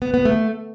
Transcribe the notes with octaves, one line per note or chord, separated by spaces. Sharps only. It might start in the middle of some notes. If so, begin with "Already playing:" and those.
B3
B3
A3